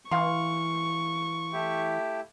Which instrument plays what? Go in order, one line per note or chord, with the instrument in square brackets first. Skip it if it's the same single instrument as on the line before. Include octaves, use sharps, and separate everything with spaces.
[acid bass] E3 [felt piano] F5 C6 [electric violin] C#6
[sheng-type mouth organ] A3 E4 G4